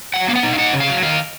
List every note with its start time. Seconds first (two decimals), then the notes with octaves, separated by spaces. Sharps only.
0.14 F#3 F#5
0.28 B3 F5
0.36 F#5
0.43 D#4
0.53 F5
0.58 D#4 F#5
0.73 C#3
0.80 F5
0.88 F#3
1.02 D#3 F5